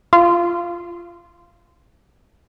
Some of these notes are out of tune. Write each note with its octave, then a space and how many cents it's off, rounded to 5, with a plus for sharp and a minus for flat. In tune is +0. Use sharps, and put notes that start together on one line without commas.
F4 -15